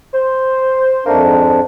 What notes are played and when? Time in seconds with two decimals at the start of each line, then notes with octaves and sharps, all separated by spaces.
0.13 C5
1.06 F2 D#3 A3 A#3 D4
1.24 G#2